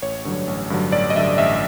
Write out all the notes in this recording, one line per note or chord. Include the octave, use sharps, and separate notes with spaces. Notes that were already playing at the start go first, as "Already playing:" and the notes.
A1 C#5
G2 D3 F#3
A1
G2 D3 F#3
A1 D5
D#5
G2 D3 F#3 E5
A1 E5